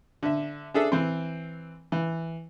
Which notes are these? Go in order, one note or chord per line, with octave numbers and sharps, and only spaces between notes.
D3 E5
D4 G#4 A4 E5
E3 C4
E3